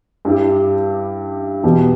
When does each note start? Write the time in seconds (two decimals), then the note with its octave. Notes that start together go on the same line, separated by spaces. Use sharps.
0.25 G2 G3 E4 G4
1.63 E2 B2 B3 G4